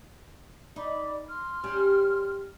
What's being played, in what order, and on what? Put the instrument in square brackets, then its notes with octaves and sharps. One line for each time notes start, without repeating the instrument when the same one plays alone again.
[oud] D#4 [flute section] D5 B5 D6
[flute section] C6 F6
[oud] G3 C#4 G4